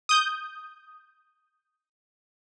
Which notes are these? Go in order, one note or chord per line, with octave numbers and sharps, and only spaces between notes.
D#6 G6